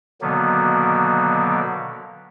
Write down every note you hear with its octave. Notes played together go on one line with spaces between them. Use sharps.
B2 D3 D#3 F#3 A#3 B3